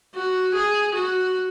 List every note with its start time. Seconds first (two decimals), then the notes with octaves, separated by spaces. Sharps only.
0.15 F#4
0.54 G#4
0.94 F#4